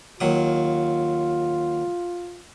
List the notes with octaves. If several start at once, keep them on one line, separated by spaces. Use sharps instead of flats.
D#2 F#3 F4 D#6